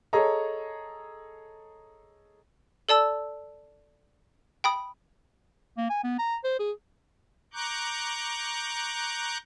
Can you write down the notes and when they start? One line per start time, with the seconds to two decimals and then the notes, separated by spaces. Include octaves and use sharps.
0.13 G#4 A4 C#5 D#5 A#5
2.89 A4 D5 A5 E6
4.64 G5 B5 D#6
5.77 A#3
5.90 G#5
6.04 B3
6.18 A#5
6.44 C5
6.59 G#4
7.53 A#5 C#6 D6 F#6 G6